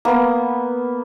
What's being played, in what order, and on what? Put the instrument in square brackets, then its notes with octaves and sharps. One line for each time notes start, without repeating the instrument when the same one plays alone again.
[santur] A#3 B3